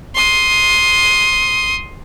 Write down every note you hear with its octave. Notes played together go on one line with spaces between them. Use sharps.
C6 D#6